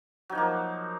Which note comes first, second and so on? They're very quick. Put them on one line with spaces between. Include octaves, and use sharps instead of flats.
F#3 D#4 F3 A#3